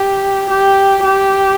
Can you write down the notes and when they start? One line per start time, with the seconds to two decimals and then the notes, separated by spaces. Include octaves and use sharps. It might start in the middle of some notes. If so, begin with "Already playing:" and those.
Already playing: G4
0.50 G4
1.04 G4